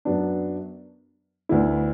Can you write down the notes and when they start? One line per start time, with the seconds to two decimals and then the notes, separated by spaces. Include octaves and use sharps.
0.05 F#2 F#3 B3 D4
1.49 D2 D3 B3 E4